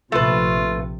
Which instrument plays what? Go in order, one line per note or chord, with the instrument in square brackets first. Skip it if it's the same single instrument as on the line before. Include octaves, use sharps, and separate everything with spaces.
[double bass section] A#1 C3 [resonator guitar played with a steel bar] A3 B4 [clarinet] F4